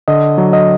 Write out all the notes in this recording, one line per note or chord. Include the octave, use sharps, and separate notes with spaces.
D3 D#5
F#3
D#5